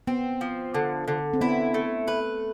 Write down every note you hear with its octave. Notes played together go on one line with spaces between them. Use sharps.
B3 C4
F3
D3
D3
C4
B3 E4
A3
B4